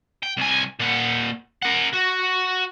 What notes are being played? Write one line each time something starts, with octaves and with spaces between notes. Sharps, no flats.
G5
C2 G#5
A#2 F#5
A#4 F#5
F#4